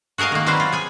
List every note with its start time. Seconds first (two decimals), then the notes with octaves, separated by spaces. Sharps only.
0.18 F#4 G#4 A#4 D#5 F5
0.32 D#3 A#3
0.46 F#3 G3 C4 E4 B4 C5
0.60 F4
0.73 G#4 G#5